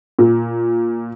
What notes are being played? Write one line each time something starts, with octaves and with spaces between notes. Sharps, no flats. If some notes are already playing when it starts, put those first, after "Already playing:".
A#2